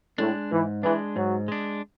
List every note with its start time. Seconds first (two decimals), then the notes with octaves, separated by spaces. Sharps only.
0.18 A2 G#3 D4
0.52 G#2 E3
0.83 E3 G#3 D4
1.16 G#2 F#3
1.48 G#3 D4